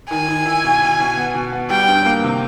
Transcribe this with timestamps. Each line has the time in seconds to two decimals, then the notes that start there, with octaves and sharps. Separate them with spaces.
0.10 D#3 G#5
0.28 D#3
0.46 E4
0.64 B2
0.81 B2
1.00 B2
1.17 B3
1.35 B2
1.52 B3
1.70 G3 G5
1.88 G2
2.06 A#3
2.24 C3